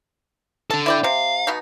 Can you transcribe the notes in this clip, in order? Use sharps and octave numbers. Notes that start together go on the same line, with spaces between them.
D4 A4 A5
E4 D5 G5
C3 F5
B2 B3 D#4